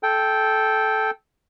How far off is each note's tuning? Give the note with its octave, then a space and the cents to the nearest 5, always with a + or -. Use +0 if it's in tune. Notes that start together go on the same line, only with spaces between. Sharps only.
A4 -15 G5 +0